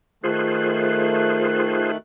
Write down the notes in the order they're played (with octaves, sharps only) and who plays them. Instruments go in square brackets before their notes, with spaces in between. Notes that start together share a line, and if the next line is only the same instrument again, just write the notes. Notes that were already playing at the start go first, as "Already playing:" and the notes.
[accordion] D#3 A3 F#6 [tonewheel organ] F4 G#4 C5